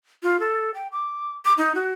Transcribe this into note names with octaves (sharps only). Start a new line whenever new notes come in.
F4
A4
G5
D6
D6
D#4
F#4